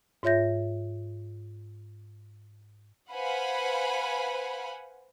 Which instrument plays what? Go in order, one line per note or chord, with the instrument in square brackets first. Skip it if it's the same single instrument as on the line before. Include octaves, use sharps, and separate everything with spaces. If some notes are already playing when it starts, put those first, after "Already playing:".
[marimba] G#2 F4 C#5 E5 G6 A#6
[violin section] B4 C5 F5 F#5 G#5 B5